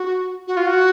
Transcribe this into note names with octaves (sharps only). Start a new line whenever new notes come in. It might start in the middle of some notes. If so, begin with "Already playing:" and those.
Already playing: F#4
F#4
F4
F#4